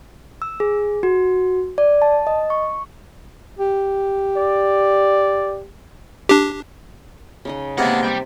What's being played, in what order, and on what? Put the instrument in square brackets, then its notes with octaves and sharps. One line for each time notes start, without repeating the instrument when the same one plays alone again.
[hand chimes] E6
G#4
F#4
D5
A5
D#5
C#6
[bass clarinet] G4
[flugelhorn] D5
[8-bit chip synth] D4 G4
[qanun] C#3 D#4 D#5
[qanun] C3 [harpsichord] G#3 A#3 B3 [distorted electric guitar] D5 F#5
[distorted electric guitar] G3 G5